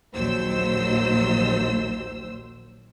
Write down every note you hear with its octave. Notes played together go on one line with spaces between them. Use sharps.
A#1 D#2 A#2 F#3 C5 E6